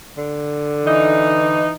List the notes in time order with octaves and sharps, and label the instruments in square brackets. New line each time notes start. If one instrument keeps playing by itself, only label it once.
[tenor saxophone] D3
[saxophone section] E3 D#4